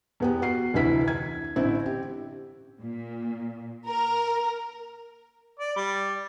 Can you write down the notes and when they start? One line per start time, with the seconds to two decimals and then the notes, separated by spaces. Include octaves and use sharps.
0.20 E2 B3 G4
0.42 F#4 C7
0.74 F1 D2 E3 E4 B6
1.08 G#6
1.56 A1 D3 C4 E4
1.86 G4
2.80 A#2
3.86 A#4
5.60 D5
5.76 G3